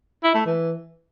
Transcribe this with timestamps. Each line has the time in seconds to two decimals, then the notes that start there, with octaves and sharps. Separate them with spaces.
0.24 E4
0.35 A3
0.46 E3